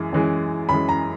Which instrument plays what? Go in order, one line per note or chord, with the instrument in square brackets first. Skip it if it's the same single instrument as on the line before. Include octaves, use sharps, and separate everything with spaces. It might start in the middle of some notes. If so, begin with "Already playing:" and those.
Already playing: [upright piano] F#2 E3 G#3
F#2 E3 G#3
F#2 E3 G#3 B5
A#5